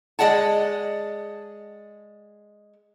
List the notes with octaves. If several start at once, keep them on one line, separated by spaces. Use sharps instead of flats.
G#3 D5 F#5 A5